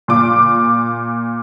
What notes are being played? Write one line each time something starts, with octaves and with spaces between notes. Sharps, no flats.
A#2 D6